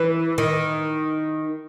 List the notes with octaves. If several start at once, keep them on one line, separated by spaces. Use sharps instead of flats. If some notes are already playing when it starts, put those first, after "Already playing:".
Already playing: E3
D#3